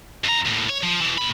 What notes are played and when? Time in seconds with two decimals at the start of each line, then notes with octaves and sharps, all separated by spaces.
0.24 F2 A#5
0.45 D#2 A2
0.69 C#5
0.83 F3
1.01 B2 E3
1.18 A#2 B5